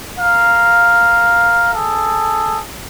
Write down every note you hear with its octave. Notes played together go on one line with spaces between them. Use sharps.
A#4 F5
G#4 A4